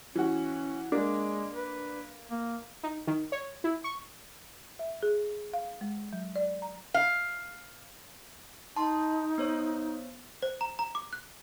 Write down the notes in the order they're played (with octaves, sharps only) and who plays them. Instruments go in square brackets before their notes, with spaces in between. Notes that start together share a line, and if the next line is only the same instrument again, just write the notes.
[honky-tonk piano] E3 F#4 [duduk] C#4
[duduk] G#3 [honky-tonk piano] A#3 [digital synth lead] D4
[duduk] B4
A#3
[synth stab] D#4
D#3
C#5
E4
C#6
[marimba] E5
G#4
F5
G#3
F#3
D5
A#5
[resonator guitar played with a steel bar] F5
[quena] D#4 [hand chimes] A5 C6
[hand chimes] B3 C5 C#5
[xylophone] C5
A#5
A#5
D6
F#6